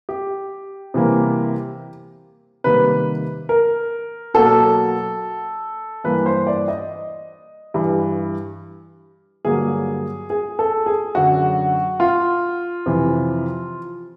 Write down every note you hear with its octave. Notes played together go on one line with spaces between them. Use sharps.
G4
C3 E3 G3 A#3
C3 D#3 G3 A#3 B4
A#4
B2 F#3 A#3 A4
G2 E3 G3 A#3 B4
C5
D5
D#5
G2 E3 G3
G2 D3 F#3 A#3 G#4
G#4
A4
G#4
F#2 D3 F#3 F#4
F4
F2 C3 E3